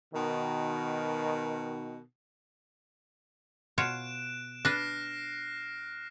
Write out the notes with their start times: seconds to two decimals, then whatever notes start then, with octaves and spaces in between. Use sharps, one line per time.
0.13 B2 D#3
3.78 B2 F4 C#5 F#6 D7 E7
4.65 D4 B4 F6 A#6 C7